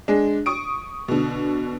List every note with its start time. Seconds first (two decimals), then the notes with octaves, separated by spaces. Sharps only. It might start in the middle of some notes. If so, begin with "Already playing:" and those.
0.08 G#3 D4
0.46 C#6 D#6 D7
1.08 B2 D3